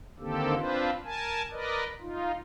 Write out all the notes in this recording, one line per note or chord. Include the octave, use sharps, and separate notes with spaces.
D3 D#3 A#3 C4 G4 A4
C4 D4 F4 B4 C5
A#4 G#5 A5
A#4 B4 D5 D#5
D#4 F4